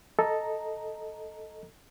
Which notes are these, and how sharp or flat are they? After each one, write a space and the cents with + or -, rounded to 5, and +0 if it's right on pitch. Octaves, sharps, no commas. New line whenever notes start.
A4 +0 D#5 +0 A#5 +0